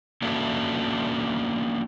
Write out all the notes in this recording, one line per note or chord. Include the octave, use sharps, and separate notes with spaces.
A#3 C#4 D4 E4 F#4 A4